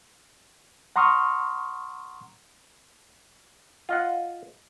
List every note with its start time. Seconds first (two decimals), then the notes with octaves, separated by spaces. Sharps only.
0.96 F#5 A#5 C6 C#6 D#6 F6
3.89 F4 D#5 F#5